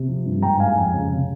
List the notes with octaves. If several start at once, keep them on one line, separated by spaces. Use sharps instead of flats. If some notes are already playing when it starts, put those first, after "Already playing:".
Already playing: C3
F3
G2
G#2 G5 A#5
G#3 F5 G#5
F2
C#3
C3